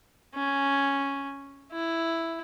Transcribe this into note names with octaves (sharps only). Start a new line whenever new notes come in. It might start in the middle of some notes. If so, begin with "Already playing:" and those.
C#4
E4